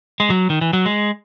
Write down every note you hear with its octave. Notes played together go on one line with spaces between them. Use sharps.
G#3
F#3
D#3
E3
F#3
G#3